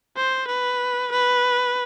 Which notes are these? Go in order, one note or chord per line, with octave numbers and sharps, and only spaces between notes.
C5
B4
B4